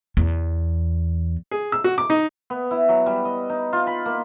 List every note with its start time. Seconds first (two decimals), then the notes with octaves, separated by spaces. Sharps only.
0.17 E2
1.51 G#4
1.72 E6
1.84 F#4
1.98 D6
2.10 D#4
2.50 B3
2.71 E4
2.89 F#3
3.06 G3
3.25 D#5
3.50 D#4
3.73 F4
3.87 B5
4.06 A#3